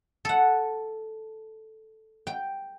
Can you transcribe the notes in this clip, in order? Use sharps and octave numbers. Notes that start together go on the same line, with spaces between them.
A4 F#5
G5